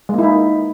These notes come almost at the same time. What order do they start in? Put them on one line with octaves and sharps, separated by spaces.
G#3 A#3 E4 D#4